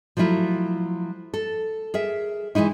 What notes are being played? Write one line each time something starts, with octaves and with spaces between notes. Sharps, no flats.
F3 F#3 A3 E4 F4
A4
G#4 A#4 E5
E3 F#3 G#3 D#4 E4